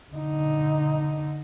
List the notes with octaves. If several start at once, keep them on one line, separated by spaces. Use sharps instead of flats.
D3 D#4